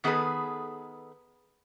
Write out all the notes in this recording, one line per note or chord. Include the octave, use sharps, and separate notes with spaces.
D#3 B3 G#4 A4 B4